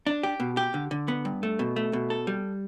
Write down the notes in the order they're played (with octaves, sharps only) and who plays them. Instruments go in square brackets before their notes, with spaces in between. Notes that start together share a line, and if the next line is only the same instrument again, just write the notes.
[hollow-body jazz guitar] D4
G4
B2
G4
D3
D3
B3
G2
A3
B2
A3
B2
A4
G3